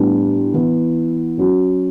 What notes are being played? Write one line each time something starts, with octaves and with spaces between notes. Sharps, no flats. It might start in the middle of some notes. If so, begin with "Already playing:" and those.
Already playing: A2 G3 B3 D4 G4
E3 B3 E4
F#3 C#4 F#4